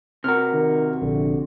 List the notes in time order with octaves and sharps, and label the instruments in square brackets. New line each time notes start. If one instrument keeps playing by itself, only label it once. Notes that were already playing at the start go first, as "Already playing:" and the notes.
[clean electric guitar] C3 F#4 [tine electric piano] A#4 F6
[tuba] D#3
[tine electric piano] A#1 [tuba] D3